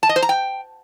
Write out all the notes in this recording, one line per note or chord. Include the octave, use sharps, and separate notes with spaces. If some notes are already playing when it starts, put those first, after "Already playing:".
A5
D#5
C5
A#5
G5